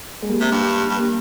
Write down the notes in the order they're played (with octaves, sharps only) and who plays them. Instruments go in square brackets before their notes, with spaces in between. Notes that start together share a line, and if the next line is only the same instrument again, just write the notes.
[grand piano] G#3
G3 A#3
[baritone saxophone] C3
G2
G2
[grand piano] G3 A#3